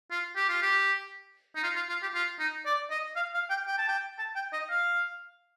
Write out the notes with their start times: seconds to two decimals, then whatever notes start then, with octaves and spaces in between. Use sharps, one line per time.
0.11 F4
0.36 G4
0.49 F4
0.62 G4
1.55 D#4
1.63 F4
1.76 F4
1.89 F4
2.02 G4
2.14 F4
2.39 D#4
2.66 D5
2.90 D#5
3.16 F5
3.34 F5
3.50 G5
3.67 G5
3.78 A5
3.88 G5
4.18 A5
4.36 G5
4.53 D#5
4.70 F5